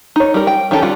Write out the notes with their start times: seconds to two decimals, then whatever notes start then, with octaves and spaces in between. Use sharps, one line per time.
0.16 D#4 C#5
0.34 G3 A#4
0.47 G5
0.71 D#3 C#4 G4 A4
0.82 G3 F4 F#5